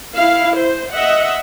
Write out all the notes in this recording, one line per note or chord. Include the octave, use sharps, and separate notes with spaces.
E4 F5
C5
D#5 E5 F#5